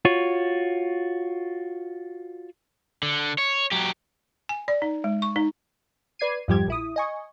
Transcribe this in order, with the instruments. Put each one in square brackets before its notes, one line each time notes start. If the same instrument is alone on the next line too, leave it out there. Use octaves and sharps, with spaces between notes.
[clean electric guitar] F4 F#4 C#5
[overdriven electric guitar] D3
C#5
F#3 G4
[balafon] G#5
D5
D#4
G#3
C#6
D#4
[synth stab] B4 D5 G#6 C7 D#7
F2 G#2 F3 G3 G4 G#6
A#1 E4 D#6
D#5 G#5 C#6